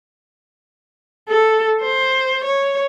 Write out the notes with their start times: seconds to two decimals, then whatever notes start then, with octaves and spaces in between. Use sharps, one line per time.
1.28 A4
1.81 C5
2.44 C#5